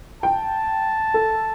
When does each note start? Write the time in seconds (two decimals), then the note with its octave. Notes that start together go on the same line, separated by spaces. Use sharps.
0.23 G5 A5
1.14 A4